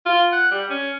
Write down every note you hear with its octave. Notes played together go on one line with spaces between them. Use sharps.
F4
F#5
G3
C#4